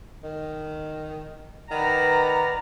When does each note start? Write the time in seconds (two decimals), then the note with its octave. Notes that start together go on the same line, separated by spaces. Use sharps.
0.24 D#3
1.71 D#3 B4 D5 F#5 A#5